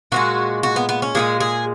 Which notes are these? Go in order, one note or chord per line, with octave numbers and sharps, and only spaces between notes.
A#2 F3 G#3 F#4
F#4
B3
B3
C#4
A#2 F3 G#3 G#4
G#4